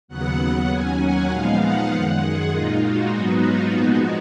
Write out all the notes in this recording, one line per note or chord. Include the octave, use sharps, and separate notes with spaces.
D#2 C#3 F#3 B3 F#5
D#2 D#3 F#3 C#4 G#5
F#5
A#2 F3 G#3 B3 D#4 F5
F#5
F#2 D#3 G#3 F#5
G#4
A#2 G#3 D#4 F4
F#4
G#2 F#3 B3 D#4 F#4
F4
A#2 F3 G#3 B3 D#4 F#4